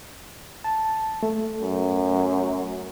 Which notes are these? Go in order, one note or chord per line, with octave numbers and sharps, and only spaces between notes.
A5
A3
F#2